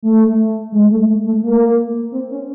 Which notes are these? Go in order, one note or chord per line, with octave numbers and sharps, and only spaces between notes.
A3
G#3
A3
A3
A3
A#3
C4
C#4